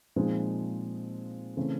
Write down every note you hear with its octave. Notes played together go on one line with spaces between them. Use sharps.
A#2 F3 G#3 C4 D#4
C#3 E3 A3 C4